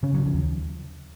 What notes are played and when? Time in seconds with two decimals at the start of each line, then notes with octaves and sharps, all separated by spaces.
0.03 C#3 C#4
0.14 C#3 F#3
0.26 F3
0.33 D#2